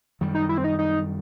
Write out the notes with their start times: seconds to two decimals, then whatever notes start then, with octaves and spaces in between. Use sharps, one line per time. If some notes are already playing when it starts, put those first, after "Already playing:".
0.21 F#2 D#3 G3
0.35 D#4
0.49 E4
0.58 C4
0.64 D#4
0.79 D#4